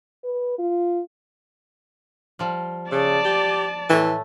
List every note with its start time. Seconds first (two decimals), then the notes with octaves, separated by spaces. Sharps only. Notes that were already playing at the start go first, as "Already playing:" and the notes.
0.24 B4
0.59 F4
2.39 F3 G3
2.92 C#3 D5 A5
3.25 G4
3.90 A2 E3 A3 G#5